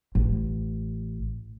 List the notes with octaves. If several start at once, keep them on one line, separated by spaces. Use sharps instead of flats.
A1